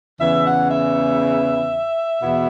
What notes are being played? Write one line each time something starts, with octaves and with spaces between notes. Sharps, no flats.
E2 C#3 E3 E5
F#5
E5
E2 B2 B3 E4